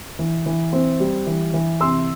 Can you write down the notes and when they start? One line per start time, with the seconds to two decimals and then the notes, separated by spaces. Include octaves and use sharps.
0.19 E3
0.46 E3
0.73 C4
1.00 G3
1.27 E3
1.54 E3
1.81 C3 C6 E6